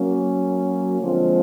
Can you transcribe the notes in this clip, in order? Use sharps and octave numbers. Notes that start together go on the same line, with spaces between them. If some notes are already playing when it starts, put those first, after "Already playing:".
Already playing: F#3 A#3 C#4
D3 F3 G#3 C4 F4